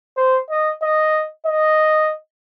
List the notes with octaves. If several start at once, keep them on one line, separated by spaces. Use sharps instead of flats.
C5
D#5
D#5
D#5